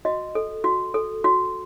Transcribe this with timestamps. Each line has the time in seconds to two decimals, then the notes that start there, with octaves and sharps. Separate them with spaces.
0.05 F#4 D#5
0.35 A4
0.64 F#4
0.94 A4
1.24 F#4